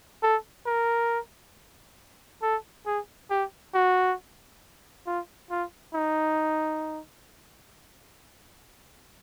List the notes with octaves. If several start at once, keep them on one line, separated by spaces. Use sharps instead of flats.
A4
A#4
A4
G#4
G4
F#4
F4
F4
D#4